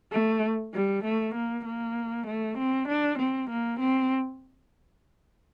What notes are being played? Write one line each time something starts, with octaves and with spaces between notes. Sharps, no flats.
A3
G3
A3
A#3
A#3
A3
C4
D4
C4
A#3
C4